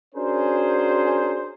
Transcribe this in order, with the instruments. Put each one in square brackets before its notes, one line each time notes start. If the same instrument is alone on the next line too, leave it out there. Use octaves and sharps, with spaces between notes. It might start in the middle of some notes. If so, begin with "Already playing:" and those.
[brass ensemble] C#4 D4 F#4 G#4 A#4 C5